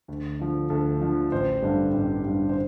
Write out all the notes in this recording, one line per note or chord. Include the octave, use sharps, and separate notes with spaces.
D2
D3 F3
D2 A4
D3 F3
A1 C5
G2 D3 G3
A1
G2 D3 G3
C5